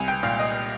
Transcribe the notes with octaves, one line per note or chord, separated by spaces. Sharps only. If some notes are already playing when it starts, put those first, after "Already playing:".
Already playing: C2 G#5
G5
A#2 F5
D#5